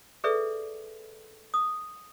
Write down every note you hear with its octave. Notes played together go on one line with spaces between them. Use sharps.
G#4 A4 B4 D5 E5
D#6